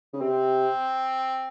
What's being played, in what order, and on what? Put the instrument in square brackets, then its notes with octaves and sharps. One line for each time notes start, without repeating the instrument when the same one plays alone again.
[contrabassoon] C#3
[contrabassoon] C3 [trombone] C4